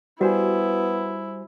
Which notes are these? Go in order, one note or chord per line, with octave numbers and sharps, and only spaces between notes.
G3 B3 E4 F#4 C5 G#5